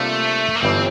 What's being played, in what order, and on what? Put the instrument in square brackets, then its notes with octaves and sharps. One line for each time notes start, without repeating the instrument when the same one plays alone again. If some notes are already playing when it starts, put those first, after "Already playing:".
Already playing: [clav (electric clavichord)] C3 G3 A#3 D4 F4 [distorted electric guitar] A3
[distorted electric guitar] A#3
[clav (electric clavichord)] G1 G2 E3 G3 [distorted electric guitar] C4